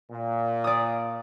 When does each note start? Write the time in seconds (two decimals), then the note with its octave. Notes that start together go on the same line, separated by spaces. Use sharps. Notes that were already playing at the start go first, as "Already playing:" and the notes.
0.11 A#2
0.64 D5 D#6